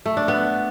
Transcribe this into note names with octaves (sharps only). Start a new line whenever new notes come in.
A3
D4
B3